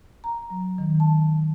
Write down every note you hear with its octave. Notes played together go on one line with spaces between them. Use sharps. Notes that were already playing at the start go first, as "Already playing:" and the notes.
A#5
F#3
D#3
A5